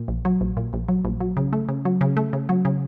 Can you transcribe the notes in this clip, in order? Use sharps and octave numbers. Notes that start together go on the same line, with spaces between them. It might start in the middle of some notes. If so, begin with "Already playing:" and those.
Already playing: A#2
A#1
F#3
A#1
A#2
A#1
F#3
A#1
F#3
C#3
A3
C#3
F#3
C#3
A3
C#3
F#3
C#3